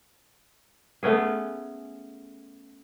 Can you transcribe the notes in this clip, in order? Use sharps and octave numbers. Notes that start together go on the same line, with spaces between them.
A3 B3 C#4 G#4